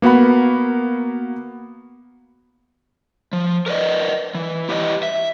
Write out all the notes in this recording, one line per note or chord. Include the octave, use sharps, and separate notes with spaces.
A#3 B3 F#4 F#5 B5
F3
A#4 B4 D5 D#5
E3
E4 G4 B4 D5 D#5
E5